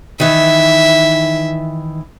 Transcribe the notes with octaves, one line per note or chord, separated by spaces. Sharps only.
D#3 E3 E5